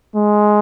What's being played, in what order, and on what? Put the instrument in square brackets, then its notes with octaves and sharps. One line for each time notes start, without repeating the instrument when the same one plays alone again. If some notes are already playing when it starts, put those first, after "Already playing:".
[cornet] G#3